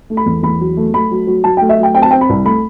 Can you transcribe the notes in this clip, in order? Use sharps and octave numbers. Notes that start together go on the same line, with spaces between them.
A3
B5
E2
E2 B5
F#3
A3
A3 B5
F#3
F#3
F#3 A5
G5
A3
E5
F#3 G5
C4 G5
A5
C4 G5
B5
C2
A3 B5